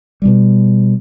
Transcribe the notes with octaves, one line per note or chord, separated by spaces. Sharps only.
B2 G3